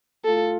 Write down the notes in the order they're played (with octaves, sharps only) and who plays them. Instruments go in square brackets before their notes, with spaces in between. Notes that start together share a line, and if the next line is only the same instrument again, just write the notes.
[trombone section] A2 A3 F4 [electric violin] A4